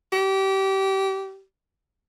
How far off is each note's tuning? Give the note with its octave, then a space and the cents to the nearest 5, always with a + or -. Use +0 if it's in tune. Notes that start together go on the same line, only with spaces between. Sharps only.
G4 -25